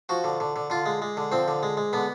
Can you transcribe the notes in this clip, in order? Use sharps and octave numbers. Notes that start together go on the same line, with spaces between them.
F3 F#4
D3
D3
D3
D3 F4
G#3
G#3
D3
F3 C4
D3
G#3
G#3
D3 B3